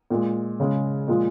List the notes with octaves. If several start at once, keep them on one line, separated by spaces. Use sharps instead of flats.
A#2 G#3
C#3 G#3
A#2 F3 G#3